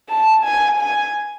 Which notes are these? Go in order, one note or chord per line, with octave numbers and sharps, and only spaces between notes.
A5
G#5
G#5